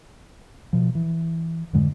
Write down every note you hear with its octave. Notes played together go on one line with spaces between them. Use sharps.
B2 F3
E3
F2 G#2 D3 G#3